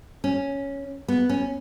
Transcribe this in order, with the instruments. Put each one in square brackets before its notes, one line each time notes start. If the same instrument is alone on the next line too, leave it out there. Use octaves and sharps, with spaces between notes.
[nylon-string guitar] C#4
B3
C#4